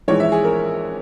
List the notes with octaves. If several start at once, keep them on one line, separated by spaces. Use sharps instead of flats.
A#1 G#2 E3 G#3 C#5
E5
G#4
A#4